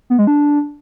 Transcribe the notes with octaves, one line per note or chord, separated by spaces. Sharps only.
B3
G#3
D4